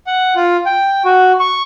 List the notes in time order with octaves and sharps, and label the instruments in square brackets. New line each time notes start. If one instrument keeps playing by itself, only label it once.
[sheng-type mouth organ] F#5
F4
G5
F#4
C#6